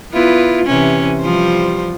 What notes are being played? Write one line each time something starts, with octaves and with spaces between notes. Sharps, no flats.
B3 E4 F4
C3 E3 C#4
F3 G3 C5